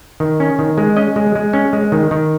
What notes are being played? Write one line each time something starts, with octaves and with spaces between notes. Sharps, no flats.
D#3
C#4
D#3
G#3
C#4 D#5
G#3
G#3
C#4
G#3
D#3
D#3